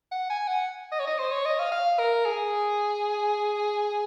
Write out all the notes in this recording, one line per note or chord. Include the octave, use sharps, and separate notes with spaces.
F#5
G#5
F#5
D#5
C#5
D#5
C5
C#5
D#5
F5
F5
A#4
G#4